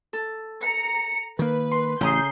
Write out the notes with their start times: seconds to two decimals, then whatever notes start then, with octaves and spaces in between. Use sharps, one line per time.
0.13 A4
0.64 A#5 C#7
1.39 D#3 A#3 B4
1.71 C6
2.01 A1 C#3 A#5 D#6 G6 C7